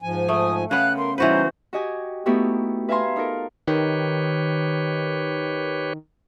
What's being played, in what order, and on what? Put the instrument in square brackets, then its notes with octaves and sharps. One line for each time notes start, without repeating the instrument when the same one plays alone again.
[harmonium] G#2 F3 G#5
[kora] A3 [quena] D#6
[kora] C#3 B3 [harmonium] F5 [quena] F#6
[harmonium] A#4 [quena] C6
[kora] E3 F#4 B4 [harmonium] G3 C#4 D#4 [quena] C5
[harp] F#4 G4 D#5 G#5
A3 B3 D#4 E4 F#4 G4
B4 E5 F5 G#5 A#5 C6
D#4 F4 A4 A#4
[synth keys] D#3 [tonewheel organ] G4 B4 C#5